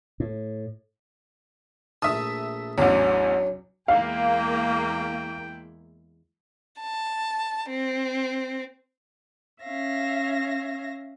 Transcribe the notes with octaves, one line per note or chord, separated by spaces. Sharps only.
A2
A#1 A3 E5 A5 D#6
A1 E2 F#3 D4
E2 G#3 A#3 E4 F5 G5
A5
C4
C#4 E5 F5 A#6